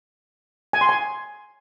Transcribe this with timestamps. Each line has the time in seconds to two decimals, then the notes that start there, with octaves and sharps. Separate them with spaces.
0.73 G#5
0.81 C6
0.89 G#5